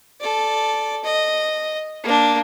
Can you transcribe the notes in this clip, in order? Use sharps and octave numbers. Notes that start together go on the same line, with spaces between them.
A4 D5
D#5
A#3 D4